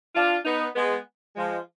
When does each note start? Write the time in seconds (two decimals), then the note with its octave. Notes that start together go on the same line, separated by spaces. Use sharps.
0.15 D4 F4
0.45 B3 D#4
0.75 G#3 B3
1.36 F3 G#3